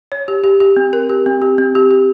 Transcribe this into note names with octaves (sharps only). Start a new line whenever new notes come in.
C#5
G4
G4
G4
C4
A#4
G4
C4
G4
C4
G4
G4